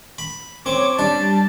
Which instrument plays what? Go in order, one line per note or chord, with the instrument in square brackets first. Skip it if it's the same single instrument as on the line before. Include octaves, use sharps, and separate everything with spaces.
[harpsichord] B5
[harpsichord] C4 [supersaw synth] C#5 [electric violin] D6
[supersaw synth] G3 [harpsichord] D4 [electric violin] A5